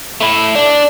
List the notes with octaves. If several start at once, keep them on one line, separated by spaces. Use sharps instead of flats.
A3 E4
D4